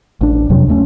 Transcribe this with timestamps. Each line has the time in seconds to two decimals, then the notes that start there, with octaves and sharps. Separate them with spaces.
0.21 A1 D4
0.50 F2 C3 F#3
0.68 D#2 A3 C#4